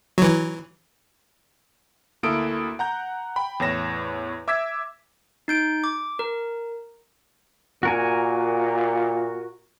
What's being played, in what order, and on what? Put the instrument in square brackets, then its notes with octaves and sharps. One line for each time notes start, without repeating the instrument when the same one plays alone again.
[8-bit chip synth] E3 F#3
[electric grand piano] D2 A#3 E4 A4 D#6 D7
F#5 A#5 G6
G5 B5
E2 A2 C#5 A#6 E7
E5 D6 E6 G#6 B6
[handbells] D#4 G6 D7
D6
A#4
[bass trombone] A#2 [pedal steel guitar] F#4 A#4 G#5